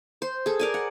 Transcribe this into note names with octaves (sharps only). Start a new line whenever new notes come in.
C5
G#4 A4
A#4 D5 G#5
F#5